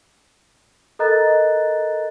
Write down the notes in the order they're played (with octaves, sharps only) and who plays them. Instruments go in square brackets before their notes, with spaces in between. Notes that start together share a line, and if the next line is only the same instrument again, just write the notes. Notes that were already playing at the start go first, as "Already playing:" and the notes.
[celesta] A4 A#4 D#5 A#5 F#6 A6